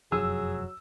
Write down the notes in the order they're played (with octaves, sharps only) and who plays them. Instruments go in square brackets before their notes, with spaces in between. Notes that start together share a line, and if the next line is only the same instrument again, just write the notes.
[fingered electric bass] F1 F#2 F3 [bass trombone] F#3 [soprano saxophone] G#4 [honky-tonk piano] E6